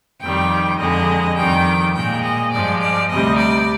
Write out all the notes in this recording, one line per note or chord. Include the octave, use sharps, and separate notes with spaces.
F2 D#3 G3 G5
F2 D3 G#3 D#5
F2 D#3 G3 G5
A#2 G#3 G5
D#5
G2 F3 G#3 D5
D5
D2 C3 G3 D#5
D5